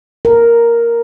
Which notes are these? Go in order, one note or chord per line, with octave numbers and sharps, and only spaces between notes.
A#4